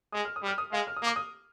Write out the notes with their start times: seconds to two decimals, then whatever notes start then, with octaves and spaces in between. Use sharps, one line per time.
0.12 G#3 D#6
0.25 F6
0.36 D#6
0.43 G3
0.47 F6
0.58 D#6
0.72 G#3 F5
0.87 F6
0.96 D#6
1.02 A#3
1.07 D6
1.16 D#6